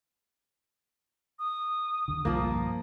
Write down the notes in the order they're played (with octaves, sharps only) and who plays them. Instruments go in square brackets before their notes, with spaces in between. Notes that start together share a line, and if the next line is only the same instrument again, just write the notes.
[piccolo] D#6
[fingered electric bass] D#2 D3
[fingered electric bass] B1 G2 [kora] F3 A#3